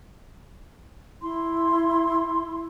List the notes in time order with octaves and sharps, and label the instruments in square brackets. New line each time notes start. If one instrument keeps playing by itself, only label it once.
[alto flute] E4 [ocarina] C6